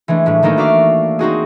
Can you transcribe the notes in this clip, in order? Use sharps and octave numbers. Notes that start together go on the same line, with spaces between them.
E3 G#3 A3 D4
A2 G3 A3
D#3 E3 A3 A#3 D#4
F#4 D5 E5 F5 D6
C4 D#4 F#4 G#4